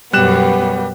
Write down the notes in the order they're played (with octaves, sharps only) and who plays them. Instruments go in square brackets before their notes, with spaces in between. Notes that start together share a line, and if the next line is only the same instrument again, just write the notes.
[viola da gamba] F#2 B2 [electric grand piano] G3 F#6 E7 [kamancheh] B3 G4